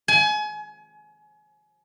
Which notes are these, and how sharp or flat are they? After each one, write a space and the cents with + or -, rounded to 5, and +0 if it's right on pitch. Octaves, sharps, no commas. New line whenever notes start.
G#5 +30